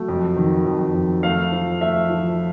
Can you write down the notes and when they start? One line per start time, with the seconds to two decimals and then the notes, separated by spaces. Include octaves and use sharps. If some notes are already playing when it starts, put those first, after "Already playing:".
Already playing: F#3 A3
0.08 F2
0.36 D#3
0.66 F2
0.94 F2
1.23 A3 F5
1.52 F3
1.81 A3 E5
2.10 F3